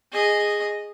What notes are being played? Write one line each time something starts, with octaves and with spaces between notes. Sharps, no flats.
G#4 D#5